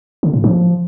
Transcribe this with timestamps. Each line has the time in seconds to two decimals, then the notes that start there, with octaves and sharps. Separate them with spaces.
0.23 D3
0.33 A2
0.44 F3